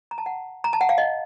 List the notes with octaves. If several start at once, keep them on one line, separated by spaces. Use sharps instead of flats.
A#5
A5
F#5
A#5
A5
F#5
F5
D#5